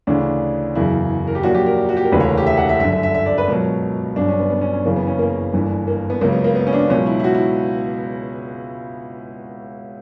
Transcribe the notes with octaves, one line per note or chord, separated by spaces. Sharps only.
D2 C#3 E3 D4
F#1 E2 C#3 F#3 E4
A#4
G4
A#1 A#2 F#3 F#4
G4
A#4
F#4
G4
A#4
E1 D2 C#3 E3 B4
C#5
A#4
G4
E5
F#5
E5
G1 F#2 D3 E5
E5
E5
E5
D5
B4
C#2 B2 F#3 A#4
G1 G2 F#3 D4
C#4
B3
B3
C#4
C#4
F#1 F#2 C#3 E3 A#3
B3
C#4
A#3
G1 G2 E3
A#3
B3
C#2 C#3 F#3 A#3
B3
A#3
B3
C#4
D4
C#2 B2 F#3 C#4
E4
E4
F#4
E4